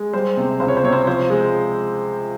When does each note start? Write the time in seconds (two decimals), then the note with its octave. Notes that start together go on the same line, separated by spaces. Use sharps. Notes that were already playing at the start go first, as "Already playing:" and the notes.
Already playing: G#3
0.13 G3 C5
0.37 C3
0.60 C#2 C5
0.68 C#5
0.77 C5
0.84 C3 C#5
0.93 C5
1.07 F3 C5
1.30 G#3